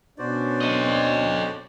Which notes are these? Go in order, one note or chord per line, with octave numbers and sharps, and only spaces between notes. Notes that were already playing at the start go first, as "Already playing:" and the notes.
B2 C#4 D4 F#4 C5 D5
A4 D#5